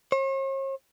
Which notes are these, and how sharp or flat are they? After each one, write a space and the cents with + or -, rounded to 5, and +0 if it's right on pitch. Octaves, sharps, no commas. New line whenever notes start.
C#5 -45